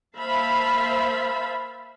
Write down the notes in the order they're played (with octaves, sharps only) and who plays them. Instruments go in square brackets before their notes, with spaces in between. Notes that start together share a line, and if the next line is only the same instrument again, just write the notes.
[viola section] A#3 C5 E5 F5 A5 B5